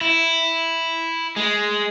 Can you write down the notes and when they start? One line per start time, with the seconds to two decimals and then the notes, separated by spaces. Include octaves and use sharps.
0.01 E4
1.36 G#3